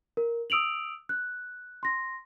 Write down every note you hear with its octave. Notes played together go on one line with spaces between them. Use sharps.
A#4
D#6 E6 D7 F7 F#7
F#6
C6 A#6